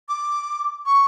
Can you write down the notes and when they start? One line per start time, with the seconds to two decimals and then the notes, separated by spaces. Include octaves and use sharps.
0.09 D6
0.86 C#6